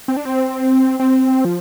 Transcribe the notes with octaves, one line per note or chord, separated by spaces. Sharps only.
C4
D4
C4
C4
F3